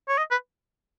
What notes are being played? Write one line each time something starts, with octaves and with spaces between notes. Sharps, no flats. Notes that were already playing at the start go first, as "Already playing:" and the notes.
C#5
D#5
B4